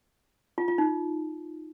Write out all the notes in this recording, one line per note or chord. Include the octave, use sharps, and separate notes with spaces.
F4
F4
D#4